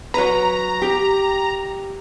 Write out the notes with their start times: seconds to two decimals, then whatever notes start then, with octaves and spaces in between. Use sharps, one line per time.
0.14 F#3 B4 A#5
0.82 G4